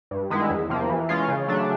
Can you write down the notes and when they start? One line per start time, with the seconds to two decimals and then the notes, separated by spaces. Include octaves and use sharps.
0.11 G2
0.30 D#3 G#3 B3 E4
0.50 E2
0.70 C3 F3 A#3
0.89 E3
1.09 G#3 C#4 F4
1.28 C#3
1.48 F#3 A3 D4